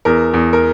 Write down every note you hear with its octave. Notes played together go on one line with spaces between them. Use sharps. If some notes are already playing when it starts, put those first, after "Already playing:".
E2 A#4
E2
A#4